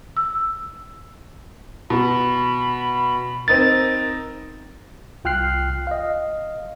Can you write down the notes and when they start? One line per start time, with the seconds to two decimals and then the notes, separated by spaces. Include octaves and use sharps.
0.17 E6
1.90 B2 B5
3.48 C4 D#4 A#4 A6
5.24 C2 F4 G5 F6 F#6 C7
5.87 D#5 F5